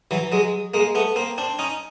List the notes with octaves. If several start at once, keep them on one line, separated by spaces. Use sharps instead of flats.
E3 F#3
F#3 G#3
G#3 A#3
A3 B3
A#3 C4
C4 D4
C#4 D#4